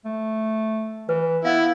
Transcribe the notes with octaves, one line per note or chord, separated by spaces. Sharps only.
A3
E3 B4
B3 E4 F5